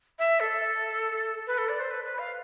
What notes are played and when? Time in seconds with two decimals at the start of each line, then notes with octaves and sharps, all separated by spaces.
0.19 E5
0.40 A4
1.47 B4
1.58 A4
1.69 D5
1.80 C5
1.90 B4
2.04 B4
2.19 F5